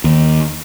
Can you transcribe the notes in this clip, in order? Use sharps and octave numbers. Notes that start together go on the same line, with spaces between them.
D#2